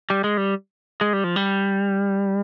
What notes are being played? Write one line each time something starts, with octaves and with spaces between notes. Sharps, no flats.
G3
G#3
G3
G#3
G3
F3
G3